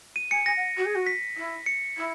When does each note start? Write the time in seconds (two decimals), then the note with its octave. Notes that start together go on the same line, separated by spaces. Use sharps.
0.16 D#7
0.31 G#5 C#7
0.46 G#5 A#6
0.56 F#5
0.76 F#4
0.85 G#4
0.95 F#4
1.06 B6
1.36 E4
1.66 C#7
1.97 E4